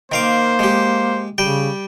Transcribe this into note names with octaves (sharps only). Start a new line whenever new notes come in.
D#3 A#3 C5 F5 D6
G#3 G4
C#3 G3 G5